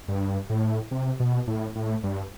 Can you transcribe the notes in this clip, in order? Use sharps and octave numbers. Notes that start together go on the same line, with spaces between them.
G2
A2
C3
B2
A2
A2
G2